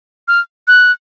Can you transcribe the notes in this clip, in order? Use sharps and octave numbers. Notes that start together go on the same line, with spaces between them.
F6
F#6